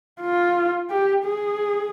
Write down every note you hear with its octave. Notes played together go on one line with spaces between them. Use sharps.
F4
G4
G#4